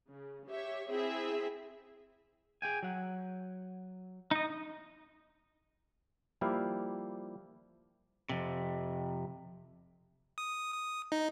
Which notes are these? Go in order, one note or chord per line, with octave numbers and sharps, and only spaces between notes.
C#3
G4 C#5 E5
C4 E4 G#4 E5 G5
G#4 G5 G#5
F#3 F#5
D#4 D#5
F3 G3 A#3 E4 G4 F5
F2 C3
D#6
D#6
D#4